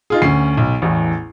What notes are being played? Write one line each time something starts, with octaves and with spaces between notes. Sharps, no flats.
D#4 F4 G#4
D2 C#4 C7
B1
A1 E2